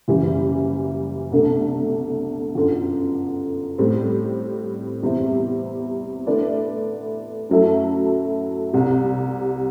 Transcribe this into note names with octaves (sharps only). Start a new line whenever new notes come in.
F#1 F#2 E3 G3
C2 B2 A3 D4 A4
G1 F#2 D3
A2 G3 C4
E2 C3 G3 C4 E4
D3 A3 E4 B4 D5
F#2 F#3 A3 E4 A4
C2 C3 G3